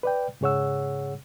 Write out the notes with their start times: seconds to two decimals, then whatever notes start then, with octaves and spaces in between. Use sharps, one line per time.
0.03 B4 D5 G5
0.41 G#2 C#3 G#4 C#5 F#5 E6